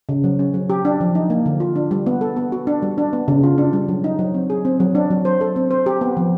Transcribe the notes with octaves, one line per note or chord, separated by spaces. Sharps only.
C#3
F#3
C#4
F#3
G4
D4
F3
D#4
A#3
D3
F4
D4
G3
B3
A4
B3
F#4
D4
G3
D4
B3
C#3
F4
D4
G3
F#3
D#4
F#3
C4
G#4
C4
F#3
D4
F#3
C5
A4
C4
C5
G4
B3
F3